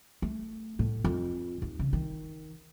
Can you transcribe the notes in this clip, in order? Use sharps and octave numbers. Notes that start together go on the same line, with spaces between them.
A3
A2
F2
D#2
C#3
D#3